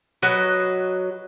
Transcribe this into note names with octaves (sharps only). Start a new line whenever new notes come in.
F#3 F#4 B4 D#5